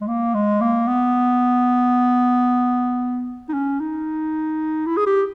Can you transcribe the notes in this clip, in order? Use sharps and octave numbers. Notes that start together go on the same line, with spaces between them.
G#3
A#3
G#3
A#3
B3
D#4
C#4
D#4
E4
G#4
G4